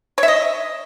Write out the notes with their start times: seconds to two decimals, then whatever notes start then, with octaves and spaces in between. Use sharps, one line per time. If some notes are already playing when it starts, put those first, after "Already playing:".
0.18 C#5
0.23 E5
0.28 D#5